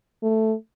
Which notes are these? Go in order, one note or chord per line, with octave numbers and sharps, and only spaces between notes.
A3